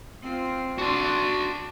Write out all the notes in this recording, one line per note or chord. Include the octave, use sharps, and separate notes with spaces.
C4 F4
D4 F#4 C6